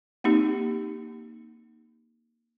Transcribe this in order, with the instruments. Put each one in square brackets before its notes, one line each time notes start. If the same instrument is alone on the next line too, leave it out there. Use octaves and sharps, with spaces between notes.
[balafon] A#3 C4 D#4 G4